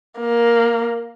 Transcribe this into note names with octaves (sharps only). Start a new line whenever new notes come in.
A#3